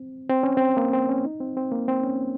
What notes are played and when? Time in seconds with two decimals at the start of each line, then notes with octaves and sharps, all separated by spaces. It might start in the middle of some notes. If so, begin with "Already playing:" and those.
Already playing: C4
0.29 C4
0.43 C#4
0.57 C4
0.77 A#3
0.93 C4
1.09 C#4
1.25 D#4
1.40 C4
1.57 C4
1.72 A#3
1.88 C4
2.03 C#4